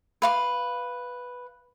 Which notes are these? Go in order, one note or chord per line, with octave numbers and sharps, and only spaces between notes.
B4 F5 D6